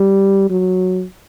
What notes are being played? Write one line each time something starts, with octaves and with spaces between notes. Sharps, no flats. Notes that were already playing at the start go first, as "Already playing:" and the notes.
Already playing: G3
F#3